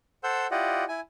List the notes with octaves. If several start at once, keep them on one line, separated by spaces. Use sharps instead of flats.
A4 C5 F#5 E6 G6
E4 F4 G4 D5 D#5 F#5
E4 G#5